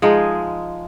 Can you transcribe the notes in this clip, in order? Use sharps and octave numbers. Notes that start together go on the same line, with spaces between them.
F3 G#3 D#4 G#4